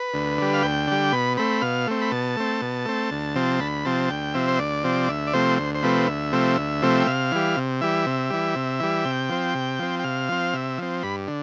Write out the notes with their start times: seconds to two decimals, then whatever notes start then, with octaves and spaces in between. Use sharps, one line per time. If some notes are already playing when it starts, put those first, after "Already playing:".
Already playing: B4
0.13 D2
0.38 D3 G3
0.54 F5
0.63 D2 G5
0.88 D3 G3
1.12 B2 B5
1.37 A3 C4 B5
1.62 B2 F5
1.87 A3 C4
2.01 B5
2.11 B2 A5
2.36 A3 C4
2.62 B2
2.85 A3 C4
3.11 D2
3.35 C3 F3 C4
3.60 D2 B5
3.85 C3 F3 C4 A5
4.10 D2 G5
4.34 C3 F3 C4 E5
4.48 C5
4.59 D2 D5
4.84 C3 F3 C4
5.09 D2 E5
5.27 D5
5.33 C3 F3 A3 C4 C5
5.58 D2 C5
5.75 C5
5.83 C3 F3 A3 C4 B4
6.07 D2 E5
6.32 C3 F3 A3 C4
6.57 D2
6.82 C3 F3 A3 C4
7.01 G5
7.07 C3 F5
7.31 E3 G3
7.57 C3
7.81 E3 G3 E5
8.06 C3
8.30 E3 G3
8.56 C3
8.80 E3 G3
9.05 C3 G5
9.30 F3 C4
9.55 C3
9.79 F3 C4
9.99 G5
10.04 C3 F5
10.29 F3 C4
10.54 C3 E5
10.78 F3 C4
11.03 G2 B5
11.28 D3